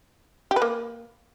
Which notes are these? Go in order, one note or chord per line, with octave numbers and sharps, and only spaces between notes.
G4
B4
A#3